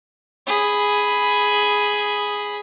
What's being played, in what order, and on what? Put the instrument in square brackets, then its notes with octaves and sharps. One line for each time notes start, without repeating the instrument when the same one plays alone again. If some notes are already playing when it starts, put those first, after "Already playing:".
[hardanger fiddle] G#4 B5